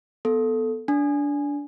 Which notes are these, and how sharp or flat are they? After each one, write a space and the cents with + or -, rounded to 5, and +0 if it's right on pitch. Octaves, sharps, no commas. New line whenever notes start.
B3 +0 A4 +0
D4 -20 G#5 +0